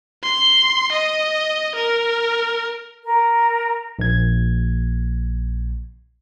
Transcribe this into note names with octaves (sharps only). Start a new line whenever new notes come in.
C6
D#5
A#4
A#4
A#1 G#6